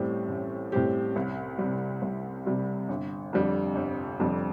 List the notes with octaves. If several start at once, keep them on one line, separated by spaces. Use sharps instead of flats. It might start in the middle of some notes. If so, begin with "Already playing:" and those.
Already playing: A1 A2 G3 C4 G4
A1
A2 G3 C4 G4
C2
G3
C3
C2
C3 G3
G1
F2 D3 G3
G1
F2 D3 G3